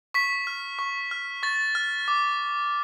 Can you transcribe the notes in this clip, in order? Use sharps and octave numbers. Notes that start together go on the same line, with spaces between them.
C#6 B6
F6
C#6
F6
C#6 A6
F6
D6